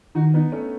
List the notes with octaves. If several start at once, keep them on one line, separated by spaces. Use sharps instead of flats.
D#3 D#4 F#4
B3 D#4
A3 C#4